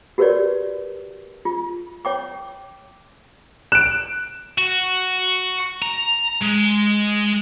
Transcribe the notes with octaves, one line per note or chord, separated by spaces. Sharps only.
F#4 G4 A#4 B4 C#5 D5
F4
C#5 G5 D6
F#6 D7 E7
F#4
A#5
G#3